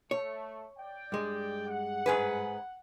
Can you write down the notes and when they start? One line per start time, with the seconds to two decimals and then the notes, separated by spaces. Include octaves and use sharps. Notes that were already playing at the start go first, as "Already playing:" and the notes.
0.11 A3 C#5
0.79 D5 G5
1.12 G2 G#3
1.68 F#5
2.06 G#2 G#4 B4